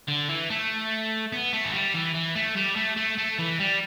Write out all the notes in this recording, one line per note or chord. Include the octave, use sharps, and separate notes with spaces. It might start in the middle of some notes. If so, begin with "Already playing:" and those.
D3
E3
A3
B3
A3
E3
G3
E3
E3
A3
G3
A3
A3
A3
E3
G3